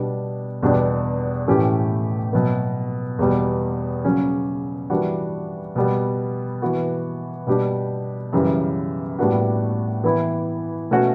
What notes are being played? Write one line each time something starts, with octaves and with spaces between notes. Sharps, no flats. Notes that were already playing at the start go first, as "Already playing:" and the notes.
Already playing: B2 G3 D4
E2 B2 G3 D4 G4
A2 E3 A3 C#4 G4
B2 F#3 B3
E2 B2 G3
C#3 F#3 C#4
E3 G3 D4 F#4
B2 G3 B3
E3 B3 F#4
B2 G3 D4 G4
F#2 C#3 E3 G3
A2 G3 B3 D4 F#4
E3 B3 E4
B2 A3 C#4 F#4